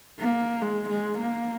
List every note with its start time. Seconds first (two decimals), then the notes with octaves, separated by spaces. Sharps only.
0.19 A#3
0.62 G#3
0.90 G#3
1.18 A#3